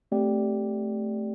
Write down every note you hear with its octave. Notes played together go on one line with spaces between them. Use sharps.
A3 C4 G4 D5 G5